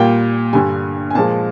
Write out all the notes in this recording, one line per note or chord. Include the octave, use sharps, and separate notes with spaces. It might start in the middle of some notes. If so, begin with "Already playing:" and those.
Already playing: A#2 G3 A#3 G5
G2 D3 G3 G#5
G#5
A#2 F3 G#3 A5